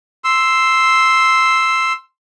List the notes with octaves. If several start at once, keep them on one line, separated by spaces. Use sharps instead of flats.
C6 E6